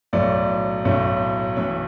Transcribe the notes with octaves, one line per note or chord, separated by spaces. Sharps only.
B1 A2 F#3 A3 D5
B1 A2 F#3 A3
B1 A2 E3 C#5